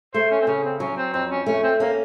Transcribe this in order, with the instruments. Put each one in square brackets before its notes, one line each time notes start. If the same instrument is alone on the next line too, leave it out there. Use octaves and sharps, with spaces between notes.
[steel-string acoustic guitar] A3 [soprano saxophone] C5
[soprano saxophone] C#4
C4
[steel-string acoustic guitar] C#3 [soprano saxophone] C#4
[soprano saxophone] C4
[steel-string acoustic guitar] F#3 [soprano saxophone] C#4
[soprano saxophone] C4
[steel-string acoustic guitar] F2 [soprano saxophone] C4
[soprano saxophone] C#4
[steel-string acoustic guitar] A3 [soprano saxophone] C#4
[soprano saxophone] C4
[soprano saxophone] A#3 [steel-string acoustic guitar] C#4